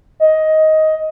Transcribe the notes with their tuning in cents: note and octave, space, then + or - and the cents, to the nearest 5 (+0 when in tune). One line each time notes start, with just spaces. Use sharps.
D#5 +10